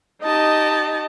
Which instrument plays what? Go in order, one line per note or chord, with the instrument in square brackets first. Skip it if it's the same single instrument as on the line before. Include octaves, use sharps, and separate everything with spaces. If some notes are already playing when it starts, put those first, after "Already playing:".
[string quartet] D#4 G4 A5 [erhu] D#5